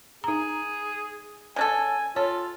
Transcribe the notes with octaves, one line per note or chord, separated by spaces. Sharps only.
D#4 G#4 A#5
C#3 D4 A4 G#5
F4 A4 C#5